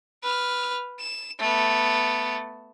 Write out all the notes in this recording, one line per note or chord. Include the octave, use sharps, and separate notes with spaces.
B4 F6
E7
A3 B3